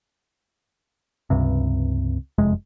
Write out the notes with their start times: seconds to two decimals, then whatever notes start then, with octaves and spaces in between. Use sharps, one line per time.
1.30 C#2 G2 C3
2.38 F#1 F2 C3 G#3